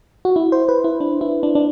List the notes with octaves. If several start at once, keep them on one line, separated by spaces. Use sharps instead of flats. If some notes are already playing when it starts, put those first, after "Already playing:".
F#4
E4
C5
B4
E4
D4
E4
D4
D4